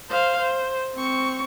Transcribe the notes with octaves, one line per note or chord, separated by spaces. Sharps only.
C5 F5
C5
C4 C#6